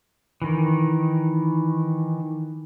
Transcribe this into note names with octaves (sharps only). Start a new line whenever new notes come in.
D#3 E3